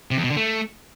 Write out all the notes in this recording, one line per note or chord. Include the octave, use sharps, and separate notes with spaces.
C3
E2
B2
D3
A3